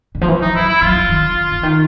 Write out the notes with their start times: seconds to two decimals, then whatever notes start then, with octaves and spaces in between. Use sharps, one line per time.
0.15 D3
0.21 F3
0.28 E3
0.42 F3 D#4
0.55 F#3 E4
0.69 E4
0.82 F#3 F4
0.96 G3
1.09 D#3
1.23 D3
1.52 D3
1.63 D#3